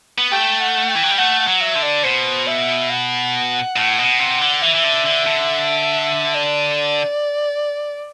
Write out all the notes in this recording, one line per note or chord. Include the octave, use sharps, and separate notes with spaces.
B3
A3 G5
F#5
G5
E3
F#3
G3
A3 F#5
F#5
F#3
E5
D3
D5
B2 C5
E5
F#5
A2
B2
C3
D3
E3 E5
E3
D3
D3
D3
D5